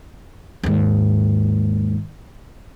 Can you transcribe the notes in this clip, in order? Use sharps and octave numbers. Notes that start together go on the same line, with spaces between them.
D#2 G#2